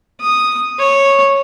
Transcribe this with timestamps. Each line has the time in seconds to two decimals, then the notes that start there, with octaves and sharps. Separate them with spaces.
0.21 D#6
0.79 C#5